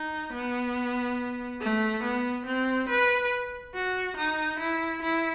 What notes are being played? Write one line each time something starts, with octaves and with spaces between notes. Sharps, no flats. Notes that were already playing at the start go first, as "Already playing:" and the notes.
Already playing: D#4
B3
A3
B3
C4
B4
F#4
D#4
E4
E4